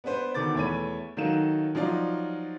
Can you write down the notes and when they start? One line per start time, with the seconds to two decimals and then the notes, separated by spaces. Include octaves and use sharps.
0.04 B3 D4 B4 C5
0.34 B2 D3 D#3 D6 A6
0.55 E2 A3 C#5 B5 D#7
1.17 D#3 F#3 D#4 A4 F5 E7
1.75 F3 F#3 D#4 F4 D5